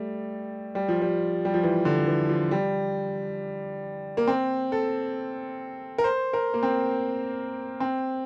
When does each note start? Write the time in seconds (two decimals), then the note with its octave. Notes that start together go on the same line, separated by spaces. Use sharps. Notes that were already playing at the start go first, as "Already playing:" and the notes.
Already playing: G3 A3
0.75 G3
0.88 F3
1.01 G3
1.45 G3
1.54 F3
1.63 E3
1.85 D3
2.07 E3
2.29 F3
2.51 G3
4.17 A#3
4.28 C4
4.72 A4
5.98 A#4
6.04 C5
6.33 A#4
6.54 A#3
6.63 C4
7.80 C4